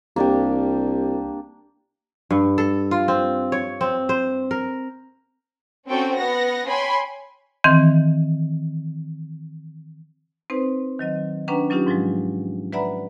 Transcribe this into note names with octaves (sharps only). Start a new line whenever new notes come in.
C2 A#3 D4 G4
G2
A4
F4
C4
C#5
C4
C5
A#4
C4 C#4 F#4 A4 G5
B3 F#5 A#6
C#5 G5 G#5 B5 C6
D#3 E3 C4
C4 D#4 B4 C5
D#3 F#3 D#5
C#4 D4 B4 F#5 G5 A#5
F#3 C#4 D#4 F4 G4
G#2 F3 F#3 G#3
B4 D5 E5 F#5 A#5 B5